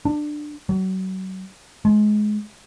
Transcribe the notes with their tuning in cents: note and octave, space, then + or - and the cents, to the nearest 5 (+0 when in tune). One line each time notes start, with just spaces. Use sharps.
D4 +20
F#3 +30
G#3 +25